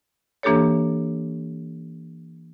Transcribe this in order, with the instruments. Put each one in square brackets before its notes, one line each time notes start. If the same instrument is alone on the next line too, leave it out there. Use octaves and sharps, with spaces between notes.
[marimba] E3 A#3 D4 G4 A4 C#5